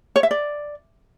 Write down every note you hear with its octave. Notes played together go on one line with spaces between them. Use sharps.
C#5
E5
D5